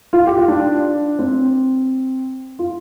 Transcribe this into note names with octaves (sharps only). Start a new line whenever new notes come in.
F4
G4
F4
D4
C4
F4